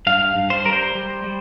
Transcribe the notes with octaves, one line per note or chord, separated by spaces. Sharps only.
G2 F5
G2
C5
G3 A#4
C5
G3
G3